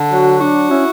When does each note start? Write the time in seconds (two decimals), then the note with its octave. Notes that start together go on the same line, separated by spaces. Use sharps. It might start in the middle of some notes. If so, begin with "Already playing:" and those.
Already playing: D3
0.11 F#3 F#4
0.41 D4 F#4
0.71 C#4 E4